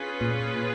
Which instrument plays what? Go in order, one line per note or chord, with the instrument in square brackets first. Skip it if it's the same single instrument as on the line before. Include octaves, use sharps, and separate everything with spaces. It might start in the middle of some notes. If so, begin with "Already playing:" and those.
Already playing: [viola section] C#4 F4 G#4 B4
[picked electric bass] A#2